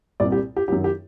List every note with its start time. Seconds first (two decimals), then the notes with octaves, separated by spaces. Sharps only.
0.20 C2 A#2 G3 C4 D5
0.32 G4
0.56 G4
0.68 F#2 D#3 F#3 G4
0.84 G4